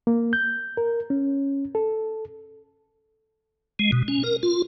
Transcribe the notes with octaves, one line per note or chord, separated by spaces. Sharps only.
A#3
G6
A#4
C#4
A4
G#3
B2
C#4
A#4
F4